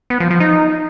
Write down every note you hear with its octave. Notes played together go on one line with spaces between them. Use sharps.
B3
F3
F3
D#4